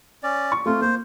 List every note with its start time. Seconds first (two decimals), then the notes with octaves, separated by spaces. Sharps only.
0.23 C#4 D5
0.52 C#6
0.66 A3 C4 F4
0.81 A#3 C5